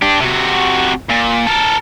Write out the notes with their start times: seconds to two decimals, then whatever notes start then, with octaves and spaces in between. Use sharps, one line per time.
0.02 D4 G4
0.20 C3 F#4
1.09 A#2
1.46 A4 A#4